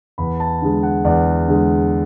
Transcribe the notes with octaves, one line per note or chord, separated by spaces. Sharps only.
E2 B5
A5
D3 G#3
F#5
E2 D5
D3 G#3